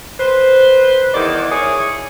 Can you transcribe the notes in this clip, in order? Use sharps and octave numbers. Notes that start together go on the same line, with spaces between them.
B4 C5
E2 D#3 D5
E4 G#4 C#5